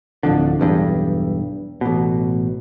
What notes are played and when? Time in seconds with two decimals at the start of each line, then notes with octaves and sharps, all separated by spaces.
0.23 D1 F2 D3
0.60 B1 E2 G2
1.81 A1 B2